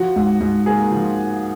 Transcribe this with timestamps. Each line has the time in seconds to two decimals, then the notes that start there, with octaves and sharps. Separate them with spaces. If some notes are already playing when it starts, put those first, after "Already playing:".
Already playing: F3 F#4
0.16 G#2
0.41 G#2
0.66 A#3 G#4
0.91 F3